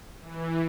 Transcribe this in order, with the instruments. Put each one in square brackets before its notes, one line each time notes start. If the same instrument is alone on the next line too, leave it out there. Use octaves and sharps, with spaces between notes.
[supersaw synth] E3